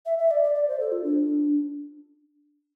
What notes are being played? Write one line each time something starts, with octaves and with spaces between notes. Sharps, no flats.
E5
E5
D5
D5
D5
C5
A4
F4
D4